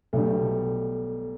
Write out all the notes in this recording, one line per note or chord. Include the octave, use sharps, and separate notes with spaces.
B1 B2 G3 A3